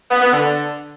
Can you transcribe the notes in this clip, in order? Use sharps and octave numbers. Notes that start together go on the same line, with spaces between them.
B3
B3
D3